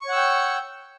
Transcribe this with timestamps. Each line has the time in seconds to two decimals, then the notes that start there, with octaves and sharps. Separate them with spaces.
0.02 C#6
0.05 C#5
0.09 F#5
0.12 E6
0.16 G5